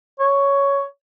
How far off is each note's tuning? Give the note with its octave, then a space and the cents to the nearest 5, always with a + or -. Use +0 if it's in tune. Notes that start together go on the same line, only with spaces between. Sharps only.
C#5 +5